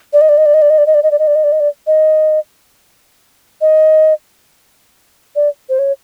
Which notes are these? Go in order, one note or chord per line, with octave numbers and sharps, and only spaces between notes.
D5
D#5
D5
D#5
D5
D#5
D5
D#5
D5
D#5
D5
D#5
D5
D#5
D5
D#5
D5
D#5
D5
D#5
D#5
D5
C5
C#5